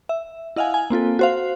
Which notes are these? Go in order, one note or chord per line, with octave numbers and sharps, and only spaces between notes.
E5
E4 D#5 F5 F#5 G#5
G#5
A#3 C4 F4 A4
F#4 C5 F5